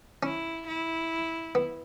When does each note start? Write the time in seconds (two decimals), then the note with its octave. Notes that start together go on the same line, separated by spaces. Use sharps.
0.23 C#4 E4
0.67 E4
1.55 B3